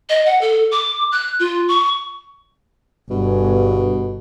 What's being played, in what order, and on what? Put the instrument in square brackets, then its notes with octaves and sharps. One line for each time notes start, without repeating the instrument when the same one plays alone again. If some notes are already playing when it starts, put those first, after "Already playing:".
[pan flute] D#5
F#5
A4
D6
F#6
F4
C#6
[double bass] G1 [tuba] G2 [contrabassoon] B2